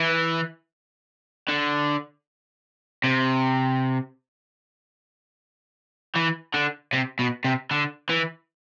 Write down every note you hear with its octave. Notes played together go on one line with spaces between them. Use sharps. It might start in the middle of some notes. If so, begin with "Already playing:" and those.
Already playing: E3
D3
C3
E3
D3
C3
B2
C3
D3
E3